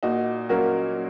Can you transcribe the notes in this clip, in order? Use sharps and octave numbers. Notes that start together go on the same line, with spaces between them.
A#2 D#4 F#4
F#3 A#3 C#4 F#4 A#4